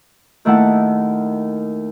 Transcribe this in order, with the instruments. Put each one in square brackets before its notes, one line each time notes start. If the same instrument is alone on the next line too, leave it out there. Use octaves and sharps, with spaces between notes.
[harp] D#2 D#3 A3 E4 F#5 A5